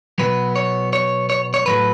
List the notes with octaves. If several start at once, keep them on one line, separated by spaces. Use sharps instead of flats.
B2 F#3 B3 B4
C#5
C#5
C#5
C#5
A2 F#3 A3 B4